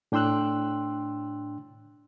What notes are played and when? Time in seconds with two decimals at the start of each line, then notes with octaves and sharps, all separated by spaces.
0.12 A2 D4 G5 C6 E6 F#6